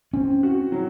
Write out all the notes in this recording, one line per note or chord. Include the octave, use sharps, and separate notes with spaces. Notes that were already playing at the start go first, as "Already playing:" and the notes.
C4 C#4
F#4
F#3